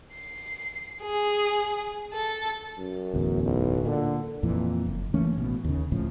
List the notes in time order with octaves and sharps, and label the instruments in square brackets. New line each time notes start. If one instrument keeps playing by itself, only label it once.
[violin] C7
G#4
A4
[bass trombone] F#2
[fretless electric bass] D1 A1 E2
[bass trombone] B1
[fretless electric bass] A#2 [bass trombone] D3
[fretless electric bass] F2 A#2 E3
F#1
E3 A3 A#3 C#4
A1 B2
D#2 C#3
C#2 A2 C#3 F3